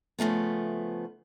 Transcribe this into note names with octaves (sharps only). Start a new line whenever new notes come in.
C#3 F3 A3 B3